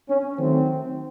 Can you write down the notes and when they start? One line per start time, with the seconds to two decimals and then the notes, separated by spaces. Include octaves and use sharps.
0.10 C#4
0.37 D#3 F#3 A3 C4